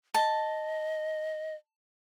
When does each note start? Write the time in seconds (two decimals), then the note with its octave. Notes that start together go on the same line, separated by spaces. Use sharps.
0.14 D#5 A5